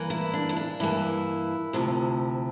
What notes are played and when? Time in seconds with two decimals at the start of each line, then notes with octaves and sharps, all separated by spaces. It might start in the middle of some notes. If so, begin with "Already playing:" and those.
Already playing: G2 E3 A#3
0.10 E4
0.33 D4
0.49 E4
0.57 D4
0.80 G2 E3 A#3 E4
1.73 D2 C3 F3